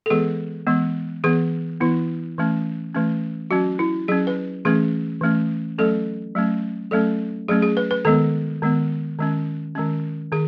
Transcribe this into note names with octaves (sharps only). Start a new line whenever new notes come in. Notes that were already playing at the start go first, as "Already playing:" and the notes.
A4
E3 G#3 B3 G#4
E3 G#3 B3
E3 B3 G#4
E3 B3 E4
E3 A3 C#4
E3 A3 C#4
F#3 C#4 F#4
E4
F#3 C#4 G#4
B4
E3 A3 C#4 G#4
E3 A3 C#4
F#3 A3 C#4 A4
F#3 A3 C#4
F#3 A3 C#4 A4
F#3 A3 C#4 G#4
G#4
B4
B4
D#3 G#3 B3 A4
D#3 G#3 B3
D#3 G#3 C#4
D#3 G#3 C#4
D#3 G#4